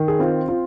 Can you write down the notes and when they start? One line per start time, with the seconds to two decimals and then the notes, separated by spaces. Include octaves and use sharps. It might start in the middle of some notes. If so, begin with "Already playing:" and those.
Already playing: D#3
0.08 G#4
0.19 C4 F4
0.48 F4